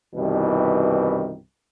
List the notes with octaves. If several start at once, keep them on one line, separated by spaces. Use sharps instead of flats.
C2 G2 B2 D#3 E3